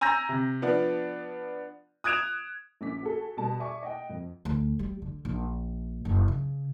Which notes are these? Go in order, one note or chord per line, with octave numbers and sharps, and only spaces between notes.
G#5 A#5 E6 G6 A#6
C3
F3 B3 D4
D#6 F#6 G#6 D7 E7 F7
A#1 C#4 D6 B6
F#4 G#4 A4
B2 G3 A5
D5 E5 G#5 C#6 D6
D#5 F#5 G5
F2
D2
G3
D3
A#1
F#1
C#3